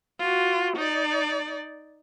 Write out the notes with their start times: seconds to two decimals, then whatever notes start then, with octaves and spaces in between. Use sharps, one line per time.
0.19 F4 F#4
0.77 D#4 D5